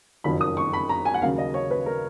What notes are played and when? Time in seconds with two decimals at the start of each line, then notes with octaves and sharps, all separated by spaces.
0.24 F#1 F2 D#3 F#3 B5
0.41 D#6
0.57 C#6
0.73 B5
0.89 A#5
1.05 G#5
1.14 F#5
1.21 D#2 C#3 F#3 F5
1.38 D#5
1.54 C#5
1.71 B4
1.86 A#4